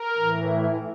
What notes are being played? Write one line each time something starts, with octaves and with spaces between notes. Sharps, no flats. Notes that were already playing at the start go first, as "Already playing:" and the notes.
Already playing: A#4
A2 E3